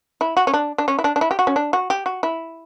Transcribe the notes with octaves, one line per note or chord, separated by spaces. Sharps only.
E4
F#4
C#4
D4
D4
C#4
E4
D4
D4
E4
G4
F#4
C#4
D4
F#4
G4
F#4
E4